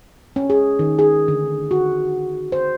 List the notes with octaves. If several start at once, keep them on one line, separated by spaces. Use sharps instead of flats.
C#4
G#4
D#3
G#4
D3
F#4
C5